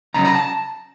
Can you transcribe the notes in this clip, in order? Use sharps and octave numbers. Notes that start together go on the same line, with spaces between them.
F2 C#3 F#3 A#5
A#5
A5